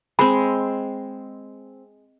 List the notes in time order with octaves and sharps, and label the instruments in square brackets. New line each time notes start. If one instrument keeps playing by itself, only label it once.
[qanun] G#3 C4 [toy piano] B5